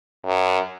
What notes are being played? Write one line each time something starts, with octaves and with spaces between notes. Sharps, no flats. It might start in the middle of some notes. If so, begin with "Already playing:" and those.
F#2